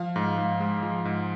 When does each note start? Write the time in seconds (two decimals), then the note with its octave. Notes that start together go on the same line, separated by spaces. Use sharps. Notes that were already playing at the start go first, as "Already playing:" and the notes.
Already playing: F3 F5
0.16 G#2
0.38 G#2
0.60 G#3
0.83 F3
1.05 G#2